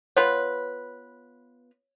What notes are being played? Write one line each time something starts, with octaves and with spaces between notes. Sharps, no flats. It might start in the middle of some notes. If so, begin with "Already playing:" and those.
B3 F4 B4 C#5